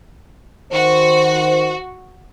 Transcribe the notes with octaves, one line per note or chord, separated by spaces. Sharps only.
D#3 F#4 C5